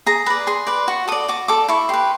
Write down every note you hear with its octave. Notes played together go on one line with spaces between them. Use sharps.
G#4 A#5
B4 D5 B5
G#4 C6
B4 D5
F#4 C#6
A4 D5 D#6
F#4 D6
A4 D5 D6
E4 C#6
G4 B4 C6